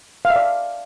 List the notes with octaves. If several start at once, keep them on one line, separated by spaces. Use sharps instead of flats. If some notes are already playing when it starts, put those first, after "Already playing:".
F5
E5
D5